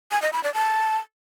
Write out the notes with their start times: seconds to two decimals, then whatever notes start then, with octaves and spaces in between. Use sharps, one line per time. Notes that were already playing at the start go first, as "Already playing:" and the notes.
0.11 G#5
0.22 D#5
0.33 B5
0.44 D5
0.54 A5